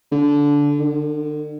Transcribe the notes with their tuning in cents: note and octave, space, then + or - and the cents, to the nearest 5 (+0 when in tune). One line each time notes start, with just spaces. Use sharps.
D3 -15
D3 +40